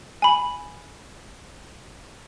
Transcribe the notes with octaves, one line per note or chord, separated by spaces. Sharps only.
G#5 B5